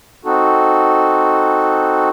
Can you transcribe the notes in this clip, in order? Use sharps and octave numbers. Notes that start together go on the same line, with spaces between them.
C4 D#4 F#4 A4